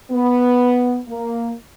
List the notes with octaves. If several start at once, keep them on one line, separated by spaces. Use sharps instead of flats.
B3
A#3